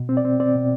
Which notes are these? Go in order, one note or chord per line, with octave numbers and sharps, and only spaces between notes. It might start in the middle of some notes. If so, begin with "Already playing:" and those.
Already playing: B2
C4
D5
C4
C4 D5
B2